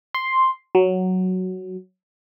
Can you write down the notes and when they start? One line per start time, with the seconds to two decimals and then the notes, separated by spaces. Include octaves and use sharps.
0.15 C6
0.75 F#3